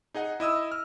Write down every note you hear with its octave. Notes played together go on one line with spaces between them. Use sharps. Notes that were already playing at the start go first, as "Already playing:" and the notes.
D#4 G#4 D#5 F#5
E4 D#5 D#6 E6
F6